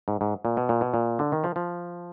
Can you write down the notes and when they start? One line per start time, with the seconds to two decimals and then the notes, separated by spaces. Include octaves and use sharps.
0.08 G#2
0.21 G#2
0.45 A#2
0.57 B2
0.69 A#2
0.81 B2
0.94 A#2
1.19 D3
1.32 D#3
1.44 F3
1.56 F3